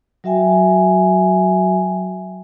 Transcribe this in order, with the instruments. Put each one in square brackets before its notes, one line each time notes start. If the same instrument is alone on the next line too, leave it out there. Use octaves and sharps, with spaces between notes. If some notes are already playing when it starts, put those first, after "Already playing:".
[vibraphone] F#3 F#4 E5 G5 G#5